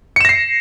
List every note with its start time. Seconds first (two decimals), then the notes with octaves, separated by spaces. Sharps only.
0.16 C#7
0.21 E7
0.25 A#6
0.29 C7